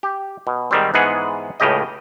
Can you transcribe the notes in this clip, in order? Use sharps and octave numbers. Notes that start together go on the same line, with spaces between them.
G4
B2
G#2 D#3 G3 C4
G#2 E3 G#3 B3 G#4 F#5
C#2 A2 C#3 G4 D#5